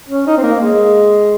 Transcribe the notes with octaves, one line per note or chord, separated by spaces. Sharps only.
C#4
D#4
C4
A#3
G#3